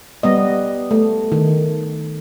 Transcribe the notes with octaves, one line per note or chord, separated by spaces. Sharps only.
G3 B3 D#5
A3
D#3